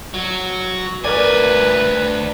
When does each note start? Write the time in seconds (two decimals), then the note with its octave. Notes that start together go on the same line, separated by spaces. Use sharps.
0.14 F#3
1.04 D2 A#4 B4 D5 G#5